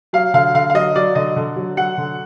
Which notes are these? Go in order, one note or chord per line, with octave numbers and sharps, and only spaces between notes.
F#3 F5
D3 F5
D3 F5
F5
F#3 D#5
F#3 D5
D3 D#5
D3
F#3
F#3 F#5
D3